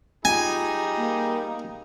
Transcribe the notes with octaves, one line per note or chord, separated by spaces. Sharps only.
G3 D#4 F4 G#4 G#5
A#3